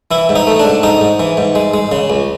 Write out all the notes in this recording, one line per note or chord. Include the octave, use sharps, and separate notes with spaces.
E3 E4
G#2
D#4
A3
D4
G#2
G#2 D#4
G#2
E3
G#2
G#3
G#3
C#3
C#2